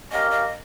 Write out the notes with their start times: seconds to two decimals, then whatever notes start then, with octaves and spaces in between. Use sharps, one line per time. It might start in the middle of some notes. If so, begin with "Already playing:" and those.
0.11 C#4 G4 A#4 D#5 F5
0.31 D#5